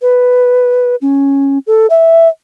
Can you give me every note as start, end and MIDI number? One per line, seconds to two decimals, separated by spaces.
0.02 0.96 71
1.02 1.58 61
1.67 1.87 69
1.90 2.28 76